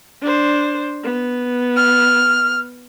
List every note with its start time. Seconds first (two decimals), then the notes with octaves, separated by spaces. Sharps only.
0.21 D4 C5
1.03 B3
1.76 F6